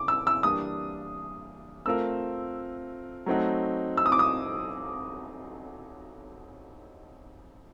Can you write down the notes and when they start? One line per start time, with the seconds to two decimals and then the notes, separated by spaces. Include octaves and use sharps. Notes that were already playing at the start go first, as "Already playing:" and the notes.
Already playing: C#3 D6
0.08 E6
0.27 E6
0.43 E3 G3 A#3 D4 D#6
1.86 A3 C4 F4 A#4 E6
3.26 F#3 A3 C4 D#4 F#4
3.97 E6
4.06 D#6
4.12 D6
4.19 D#6